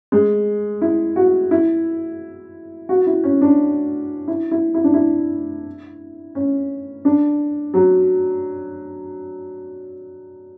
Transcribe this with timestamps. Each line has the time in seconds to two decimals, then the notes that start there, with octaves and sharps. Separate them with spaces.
0.12 G#3
0.82 E4
1.16 F#4
1.51 E4
2.89 F#4
3.07 E4
3.24 C#4
3.41 D4
4.28 E4
4.51 E4
4.74 E4
4.84 D4
4.94 E4
6.35 C#4
7.05 D4
7.74 F#3